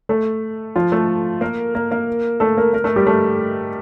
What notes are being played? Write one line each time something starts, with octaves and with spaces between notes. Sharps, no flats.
A3 A4
F3 F4
A3 A4
A#3 A#4
A#3 A#4
A#3 A#4
A3 A4
A#3 A#4
A#3 A#4
A3 A4
G3 G4
A3 A4